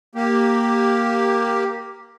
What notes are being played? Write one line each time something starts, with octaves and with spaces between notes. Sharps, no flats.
A#3 G4